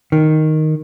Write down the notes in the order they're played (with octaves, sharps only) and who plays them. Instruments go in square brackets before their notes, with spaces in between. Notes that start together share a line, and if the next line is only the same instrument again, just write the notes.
[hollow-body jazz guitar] D#3